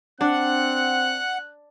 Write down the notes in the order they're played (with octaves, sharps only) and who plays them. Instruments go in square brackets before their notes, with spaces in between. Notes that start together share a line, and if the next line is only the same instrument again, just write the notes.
[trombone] C4 [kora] D4 [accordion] F#5 [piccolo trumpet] F#6